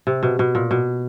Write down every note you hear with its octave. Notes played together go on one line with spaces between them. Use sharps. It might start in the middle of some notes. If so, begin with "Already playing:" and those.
C3
B2
B2
A#2
B2